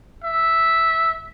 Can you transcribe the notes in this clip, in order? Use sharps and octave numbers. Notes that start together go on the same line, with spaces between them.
E5